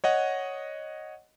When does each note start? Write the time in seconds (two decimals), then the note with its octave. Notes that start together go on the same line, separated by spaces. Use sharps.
0.04 C#5 D#5 F#5